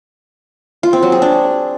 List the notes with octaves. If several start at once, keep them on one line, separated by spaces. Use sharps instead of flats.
F4
C4
F#3
G#4
D4